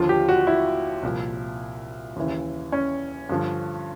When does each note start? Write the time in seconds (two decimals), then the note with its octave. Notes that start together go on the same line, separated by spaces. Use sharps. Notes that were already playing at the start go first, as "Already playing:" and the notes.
Already playing: D#2 D3 F3 F4
0.09 G4
0.29 F#4
0.47 E4
1.03 C2 A#2 F3
2.16 D#2 C#3 E3
2.72 C#4
3.29 G2 D3 F3